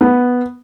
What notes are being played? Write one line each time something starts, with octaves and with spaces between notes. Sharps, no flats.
B3